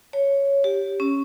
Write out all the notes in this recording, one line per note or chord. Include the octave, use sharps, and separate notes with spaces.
C#5
G4
C#4